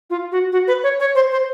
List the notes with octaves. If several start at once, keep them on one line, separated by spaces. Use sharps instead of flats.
F4
F#4
F#4
B4
C#5
C#5
C5
C5